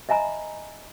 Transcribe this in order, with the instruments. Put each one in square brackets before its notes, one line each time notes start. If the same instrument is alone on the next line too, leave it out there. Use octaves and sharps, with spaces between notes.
[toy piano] D#5 E5 G#5 A#5 B5